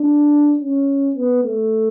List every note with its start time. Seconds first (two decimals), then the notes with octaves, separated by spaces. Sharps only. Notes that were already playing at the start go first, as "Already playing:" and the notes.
Already playing: D4
0.59 C#4
1.16 B3
1.44 A3